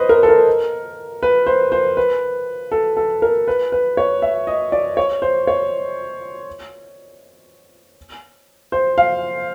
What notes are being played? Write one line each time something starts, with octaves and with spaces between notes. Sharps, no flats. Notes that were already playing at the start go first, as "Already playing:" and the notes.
Already playing: B4 C5 D#5
A#4
A4
A#4
B4
C5
C5
B4
A4
A4
A#4
B4
B4
C#5
E5
D#5
D5
C#5
C5
C#5
C5
F5